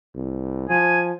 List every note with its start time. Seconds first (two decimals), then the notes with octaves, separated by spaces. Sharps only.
0.15 C2
0.69 F3 G#5